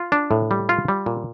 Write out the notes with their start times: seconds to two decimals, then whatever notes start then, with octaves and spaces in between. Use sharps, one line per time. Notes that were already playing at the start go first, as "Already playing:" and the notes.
Already playing: F4
0.12 D4
0.31 A2
0.51 G3
0.69 F4
0.88 G3
1.06 A#2